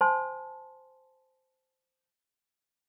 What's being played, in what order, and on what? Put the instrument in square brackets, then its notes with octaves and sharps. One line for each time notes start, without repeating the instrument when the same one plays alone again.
[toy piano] C5 G#5 A5 C6